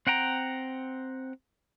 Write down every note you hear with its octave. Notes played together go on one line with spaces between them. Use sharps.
C4 F#5 G5 A#5